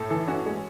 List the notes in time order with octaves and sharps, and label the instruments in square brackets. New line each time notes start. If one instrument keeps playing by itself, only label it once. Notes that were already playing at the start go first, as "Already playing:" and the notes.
Already playing: [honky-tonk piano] A2 [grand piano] A4
[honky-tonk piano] E3 [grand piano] A4
[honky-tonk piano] C#4 [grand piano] F#4
[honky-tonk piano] G#3